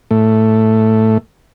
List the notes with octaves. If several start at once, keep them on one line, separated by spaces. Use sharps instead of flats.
A2 A3